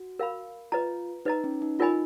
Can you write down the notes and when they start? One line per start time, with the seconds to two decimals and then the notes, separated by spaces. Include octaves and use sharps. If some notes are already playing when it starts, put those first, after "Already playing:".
Already playing: F#4
0.19 A#4 F5 B5
0.72 F4 B4 D#5 A#5
1.25 D#4 B4 D#5 A#5
1.44 C#4
1.62 D#4
1.79 D#4 F4 A#4 D#5 G#5 B5